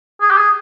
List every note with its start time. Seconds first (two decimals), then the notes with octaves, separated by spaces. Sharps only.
0.21 G#4
0.30 G4
0.38 G#4